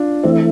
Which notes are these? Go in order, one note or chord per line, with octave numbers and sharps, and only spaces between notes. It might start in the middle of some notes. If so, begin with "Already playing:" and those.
Already playing: D4 F4
E3 A3 C4 E4